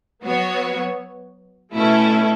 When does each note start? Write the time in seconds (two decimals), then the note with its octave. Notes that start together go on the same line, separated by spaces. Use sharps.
0.23 F#3 B3 F#4 C#5
1.74 B2 A3 C#4 E4 A4